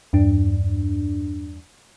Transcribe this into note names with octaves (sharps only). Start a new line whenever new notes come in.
E2 G2 D4